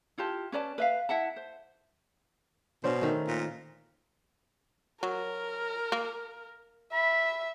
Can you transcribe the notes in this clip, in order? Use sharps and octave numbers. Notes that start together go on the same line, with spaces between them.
E4 F4 G4 A5
C#4 B4 D5 A5
B4 E5 F5
E4 E5 F#5 A5
C5
B2 C#4 D4 C5
D#3 A3
A#2
F#3 A#4
A#3
E5 B5